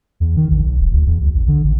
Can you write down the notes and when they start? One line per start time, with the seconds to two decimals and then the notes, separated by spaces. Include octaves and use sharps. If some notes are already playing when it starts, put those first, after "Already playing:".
0.20 E2
0.37 D#3
0.51 A#1
0.62 B1
0.80 D1
0.92 D2
1.07 E2
1.21 D2
1.34 A#1
1.48 D3
1.64 A1